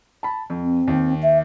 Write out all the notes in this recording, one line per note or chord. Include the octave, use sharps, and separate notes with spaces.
A5 B5
F2
C4
D#2 D#3
E5